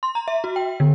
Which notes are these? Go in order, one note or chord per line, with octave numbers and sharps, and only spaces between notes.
C6
A#5
E5
F#4
G5
D3